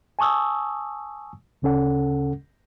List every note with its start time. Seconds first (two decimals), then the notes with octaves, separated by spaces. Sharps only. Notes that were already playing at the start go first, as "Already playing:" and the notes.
0.19 G#5 A5 C#6 D#6 E6
1.62 D2 C#3 C#4 A4 F#5